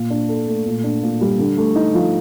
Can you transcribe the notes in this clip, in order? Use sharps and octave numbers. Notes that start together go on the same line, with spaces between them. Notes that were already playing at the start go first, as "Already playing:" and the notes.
Already playing: A#2
D4
A4
A3
A#2
D4
A#2
G3
D3
A3
D#4
F3